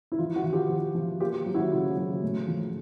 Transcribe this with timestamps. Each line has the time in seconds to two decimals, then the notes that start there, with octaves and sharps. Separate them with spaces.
0.12 E4
0.18 F3 F4
0.36 E4 F#4
0.44 F3
0.53 F4 G4
0.69 F3
0.95 F3
1.20 A#3 F4 G4
1.46 F#3
1.55 E4 F#4
1.72 C#3
1.97 F#3
2.22 A2
2.47 F3